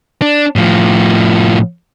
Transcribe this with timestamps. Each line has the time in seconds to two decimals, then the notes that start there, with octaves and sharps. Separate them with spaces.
0.22 D4
0.56 A2 F3